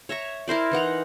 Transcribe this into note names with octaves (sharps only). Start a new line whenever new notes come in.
C#5 E5 A#5 C#6
E4 A#4 C5 D5
E3 D#4 F#5 A#5